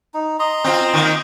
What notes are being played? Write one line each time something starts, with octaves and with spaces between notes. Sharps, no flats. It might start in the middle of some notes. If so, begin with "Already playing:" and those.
D#4
D#5 A#5 C6
C4 F4
D#3 A#3